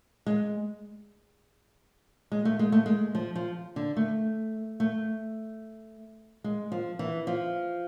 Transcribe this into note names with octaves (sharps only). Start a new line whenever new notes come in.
G#3
G#3
A3
G#3
A3
G#3
F3
F3
D3
A3
A3
G#3
F3
E3
F3